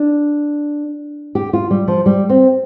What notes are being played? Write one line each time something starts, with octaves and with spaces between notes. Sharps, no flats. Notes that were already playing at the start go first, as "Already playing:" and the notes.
Already playing: D4
G4
F4
G3
F3
G3
C4